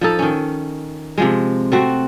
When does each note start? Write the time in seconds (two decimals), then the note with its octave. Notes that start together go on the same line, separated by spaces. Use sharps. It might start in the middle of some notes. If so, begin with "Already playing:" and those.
0.01 F3 D#4 A4
0.19 D#3 C#4
1.18 C3 F3 G#3
1.72 A3 C4 F#4